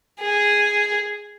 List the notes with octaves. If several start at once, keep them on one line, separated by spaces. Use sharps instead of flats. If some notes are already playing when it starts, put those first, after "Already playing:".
G#4